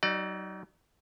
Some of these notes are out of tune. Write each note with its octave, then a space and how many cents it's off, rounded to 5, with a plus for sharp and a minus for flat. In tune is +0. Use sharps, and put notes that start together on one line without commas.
F#3 +40 D#4 +0 D5 +30